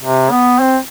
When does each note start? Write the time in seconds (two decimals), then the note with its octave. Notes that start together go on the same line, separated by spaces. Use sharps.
0.02 C3
0.31 B3
0.60 C4